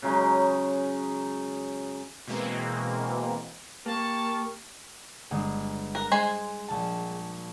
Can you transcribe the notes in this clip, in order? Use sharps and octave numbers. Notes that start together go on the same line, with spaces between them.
C#3 F#3 G#3 D#4
B2 E3 G#3 A#3 C4
A#3 G4 A5 C#6
G1 G#3
A#4 F#6
G#3 C5 G#5
A#1 A5